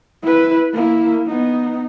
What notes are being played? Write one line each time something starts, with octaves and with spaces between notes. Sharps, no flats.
E4 B4
A#3 E4
B3 D#4